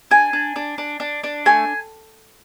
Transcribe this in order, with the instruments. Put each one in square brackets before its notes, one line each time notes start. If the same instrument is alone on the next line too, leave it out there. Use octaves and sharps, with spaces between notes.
[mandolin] D4 G#5
D4
D4
D4
D4
D4
A3 G#5